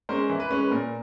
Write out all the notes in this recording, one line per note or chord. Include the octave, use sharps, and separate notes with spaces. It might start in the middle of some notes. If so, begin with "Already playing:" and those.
G#3 C#4 A#4 C5
E3
B4
G#3 C#4 B4
B4
A#2 A#4